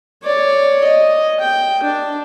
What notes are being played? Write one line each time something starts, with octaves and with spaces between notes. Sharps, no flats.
C#5 D5
D#5
G5
D4